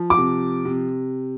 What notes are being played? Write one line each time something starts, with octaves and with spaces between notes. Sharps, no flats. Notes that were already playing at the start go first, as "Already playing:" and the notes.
Already playing: F3
D6
C3
C3